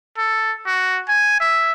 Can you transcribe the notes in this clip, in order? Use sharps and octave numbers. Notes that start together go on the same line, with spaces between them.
A4
F#4
G#5
E5